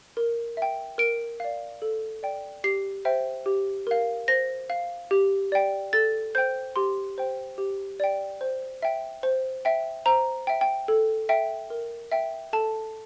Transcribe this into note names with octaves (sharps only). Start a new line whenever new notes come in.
A#4
E5 G5
A#4 D7
D5 F5
A4
D5 G5
G4 C7
C5 E5 G5
G4
A#4 F5
C5 A#6
F5
G4
D5 G5
A4 A6
C5 G5 G6
G4 C6
C5 G5
G4
D5 G5
C5
E5 G5
C5
E5 G5
C5 A#5
E5 G5
G5
A4
E5 G5
A#4
E5 G5
A4 A5